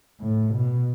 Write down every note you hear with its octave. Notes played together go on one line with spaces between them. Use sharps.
A2
B2